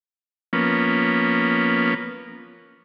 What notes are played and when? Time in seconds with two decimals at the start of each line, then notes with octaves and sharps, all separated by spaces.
0.53 F3 A#3 B3 C#4